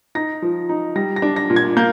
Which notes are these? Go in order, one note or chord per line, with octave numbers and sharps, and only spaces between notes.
D#4 A#6
F3
D#4
G3 A#6
A#6
D4
A#6
A#2
G#6
A#3 G6